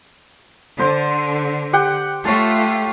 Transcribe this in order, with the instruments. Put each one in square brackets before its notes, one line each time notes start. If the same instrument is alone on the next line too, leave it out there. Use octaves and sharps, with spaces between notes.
[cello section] D3 [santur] C5
[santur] G4 F#5 G5
[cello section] A3 F4 [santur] C#5 A5